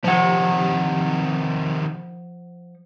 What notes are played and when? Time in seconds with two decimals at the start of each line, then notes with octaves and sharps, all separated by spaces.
0.04 C3 D#3 F3 F#5